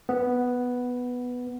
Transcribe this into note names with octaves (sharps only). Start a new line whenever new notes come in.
B3